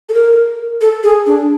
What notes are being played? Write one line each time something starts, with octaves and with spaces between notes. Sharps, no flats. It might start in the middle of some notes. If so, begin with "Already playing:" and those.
A4
A#4
A4
G#4
D4